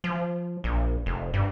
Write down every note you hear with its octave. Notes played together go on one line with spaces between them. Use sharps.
F3
A#1
F1
G2